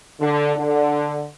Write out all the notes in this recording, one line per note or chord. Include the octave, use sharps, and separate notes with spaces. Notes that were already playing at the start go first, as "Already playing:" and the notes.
D3
D3